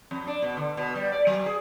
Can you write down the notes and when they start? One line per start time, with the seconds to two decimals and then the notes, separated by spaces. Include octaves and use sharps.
0.11 F2
0.27 D4
0.42 B2
0.57 D3
0.77 B2
0.95 G3
1.12 D5
1.27 F#3
1.46 G#4